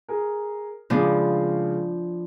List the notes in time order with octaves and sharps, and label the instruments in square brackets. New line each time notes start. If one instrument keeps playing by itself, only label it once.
[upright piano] G#4 A#4
[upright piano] C#3 G#3 G#4 [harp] F3 B3 D4